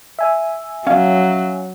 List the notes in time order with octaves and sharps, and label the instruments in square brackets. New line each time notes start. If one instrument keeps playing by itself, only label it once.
[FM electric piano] E5 G#5
[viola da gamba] F#3 [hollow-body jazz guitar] C#4 F5